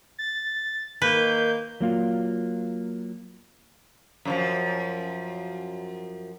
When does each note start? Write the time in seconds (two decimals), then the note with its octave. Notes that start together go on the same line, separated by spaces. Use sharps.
0.18 A6
1.02 D#3 A#3 B4 G6
1.81 F#3 A#3 F4
4.25 F#2 C#3 F3